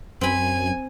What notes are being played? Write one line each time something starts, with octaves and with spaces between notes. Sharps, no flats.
F#2 C4 G#5 B5